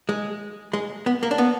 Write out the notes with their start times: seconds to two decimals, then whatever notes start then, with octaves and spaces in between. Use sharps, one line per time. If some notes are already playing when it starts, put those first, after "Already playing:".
0.09 G#3
0.73 G#3
1.06 B3
1.23 A#3
1.31 D4
1.38 B3